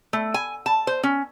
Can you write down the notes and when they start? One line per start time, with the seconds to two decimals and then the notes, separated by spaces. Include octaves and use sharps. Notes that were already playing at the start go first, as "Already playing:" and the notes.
0.13 A3
0.34 G#5
0.66 A5
0.87 C5
1.03 C#4